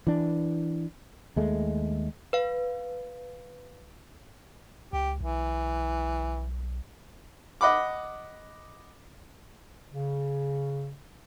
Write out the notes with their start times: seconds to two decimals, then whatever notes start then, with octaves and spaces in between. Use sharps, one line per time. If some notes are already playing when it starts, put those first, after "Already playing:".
0.07 E3 D4
1.36 D#2 G#3 A3
2.33 B4 F5
4.93 C#2 G4
5.21 B1 E3
7.61 D#5 F#5 B5 D6
9.90 C#3